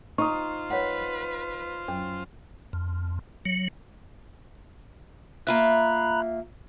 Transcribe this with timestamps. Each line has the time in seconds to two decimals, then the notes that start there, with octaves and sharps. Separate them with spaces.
0.18 D#4 F4 C5 C#6 D#6
0.71 B4 C#5 F#5
1.88 F#2 C#4
2.73 F2
3.45 F#3
5.47 A#3 F4 E5 A#5 B5 F#6